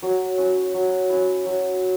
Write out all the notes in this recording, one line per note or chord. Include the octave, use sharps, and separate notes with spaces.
F#3 D5
C#4 E4
F#3
C#4 E4
F#3 E5